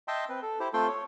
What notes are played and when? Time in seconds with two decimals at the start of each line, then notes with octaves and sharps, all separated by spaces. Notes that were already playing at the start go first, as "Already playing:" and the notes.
0.08 D#5 E5 G5 A5 C6
0.29 C4 B4
0.43 A4
0.60 E4 G4 C5
0.74 A3 C4 F4 A4 G5 C6
0.88 C#5